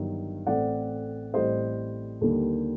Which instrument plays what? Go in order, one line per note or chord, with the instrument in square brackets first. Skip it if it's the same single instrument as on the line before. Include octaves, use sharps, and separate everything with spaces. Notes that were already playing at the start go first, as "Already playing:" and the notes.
Already playing: [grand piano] G1 G2 D#3 F#3
A1 A2 A3 C4 D5 F#5
A1 A2 G3 C4 C5 D#5
D#2 D3 G3 A#3